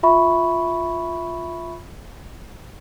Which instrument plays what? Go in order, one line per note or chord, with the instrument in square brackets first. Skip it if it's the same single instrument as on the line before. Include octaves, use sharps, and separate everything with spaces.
[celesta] F4 E5 B5 C#6